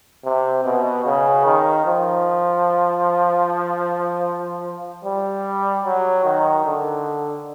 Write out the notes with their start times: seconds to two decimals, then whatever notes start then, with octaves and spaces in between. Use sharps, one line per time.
0.25 C3
0.65 B2
1.05 C#3
1.45 D#3
1.86 F3
5.05 G3
5.84 F#3
6.24 D#3
6.65 D3